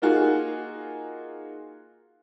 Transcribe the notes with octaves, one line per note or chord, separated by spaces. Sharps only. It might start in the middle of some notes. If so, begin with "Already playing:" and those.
A#3 D#4 F4 F#4 G#4